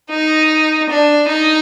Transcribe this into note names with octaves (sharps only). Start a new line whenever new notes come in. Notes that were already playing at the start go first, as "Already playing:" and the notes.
D#4
D4
D#4